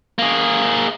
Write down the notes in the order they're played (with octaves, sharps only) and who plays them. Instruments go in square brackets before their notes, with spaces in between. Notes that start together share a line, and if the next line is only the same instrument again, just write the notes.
[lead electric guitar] A#3 G#4